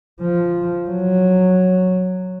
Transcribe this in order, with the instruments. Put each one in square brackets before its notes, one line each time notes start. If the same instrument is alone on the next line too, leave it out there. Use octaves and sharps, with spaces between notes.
[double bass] F3
F#3